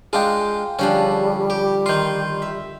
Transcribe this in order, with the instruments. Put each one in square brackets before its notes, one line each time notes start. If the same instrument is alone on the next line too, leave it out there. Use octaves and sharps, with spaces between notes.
[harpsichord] G#3 D4 F4 [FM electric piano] G#4 F5 G5
[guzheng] D3 F3 D4 [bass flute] G3 [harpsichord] C#4
[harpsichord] G4
[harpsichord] D#3 F4 [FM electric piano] C6 G6
[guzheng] E5